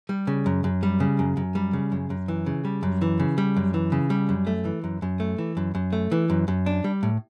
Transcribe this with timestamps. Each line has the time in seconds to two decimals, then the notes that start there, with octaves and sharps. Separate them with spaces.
0.09 G3
0.27 C#3
0.46 F#2
0.64 F#2
0.83 G3
1.00 C#3
1.19 F#2
1.37 F#2
1.55 G3
1.73 C#3
1.92 F#2
2.10 F#2
2.28 E3
2.46 C#3
2.65 G3
2.83 F#2
3.01 E3
3.20 C#3
3.38 G3
3.56 F#2
3.74 E3
3.92 C#3
4.10 G3
4.29 F#2
4.47 A3
4.65 E3
4.84 F#2
5.02 F#2
5.20 A3
5.38 E3
5.57 F#2
5.75 F#2
5.93 A3
6.12 E3
6.30 F#2
6.48 F#2
6.66 D4
6.84 G3
7.03 A2